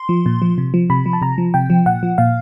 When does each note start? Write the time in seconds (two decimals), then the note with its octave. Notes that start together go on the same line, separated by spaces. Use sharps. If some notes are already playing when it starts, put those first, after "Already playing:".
Already playing: C6
0.09 F3
0.26 A#2
0.42 F3
0.58 C3
0.74 F3
0.90 C3 B5
1.06 F3
1.13 A5
1.21 C3 A#5
1.38 F3
1.54 C3 G5
1.70 F3
1.86 A#2 F#5
2.03 F3
2.18 A#2 F5